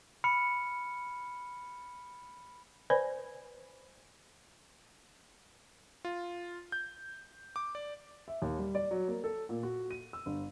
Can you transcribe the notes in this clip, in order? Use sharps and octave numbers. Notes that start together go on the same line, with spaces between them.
B5 F6 C#7
B4 C5 D5 G#5 B5
F4
G6
D6
D5
E5
D#2
G3
D5
F#3
A#3
A4
A#2
F#4
D#7
E6
G1